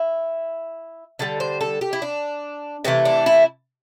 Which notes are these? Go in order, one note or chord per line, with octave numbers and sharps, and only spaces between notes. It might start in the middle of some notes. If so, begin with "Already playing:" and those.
Already playing: E4
D3 G3 A4
C5
A4
G4
E4
D4
C3 E3 A3 C4
D4
E4